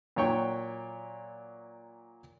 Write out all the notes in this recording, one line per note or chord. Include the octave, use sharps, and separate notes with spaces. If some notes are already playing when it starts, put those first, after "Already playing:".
A#2 F#3 C#5 G5 C#6